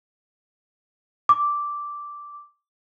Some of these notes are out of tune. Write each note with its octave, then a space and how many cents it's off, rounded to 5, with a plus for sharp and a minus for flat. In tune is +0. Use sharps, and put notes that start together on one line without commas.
D6 -5